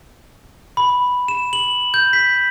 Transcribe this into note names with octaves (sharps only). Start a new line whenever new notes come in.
B5
E7
F#7
G6
B6